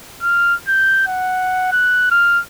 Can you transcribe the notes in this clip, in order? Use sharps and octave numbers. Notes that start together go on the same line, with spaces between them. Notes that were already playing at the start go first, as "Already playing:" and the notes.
F6
G6
F#5
F#6
F6